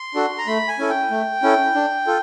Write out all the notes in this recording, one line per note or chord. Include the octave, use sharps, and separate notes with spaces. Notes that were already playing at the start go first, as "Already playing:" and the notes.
Already playing: C6
D4 F#4 A4
A#5
A3 B5
G#5
C#4 E4 A4
G5
A3
C#4 E4 A4
D4
F4 A4